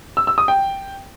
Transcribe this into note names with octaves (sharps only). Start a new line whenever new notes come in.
E6
E6
D#6
G5